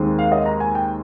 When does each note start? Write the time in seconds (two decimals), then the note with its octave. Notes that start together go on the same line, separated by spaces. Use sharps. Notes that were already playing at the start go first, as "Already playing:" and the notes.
Already playing: D#2 D#3 G#3 C4
0.19 F5
0.32 D#5
0.46 A#5
0.60 G#5
0.75 G5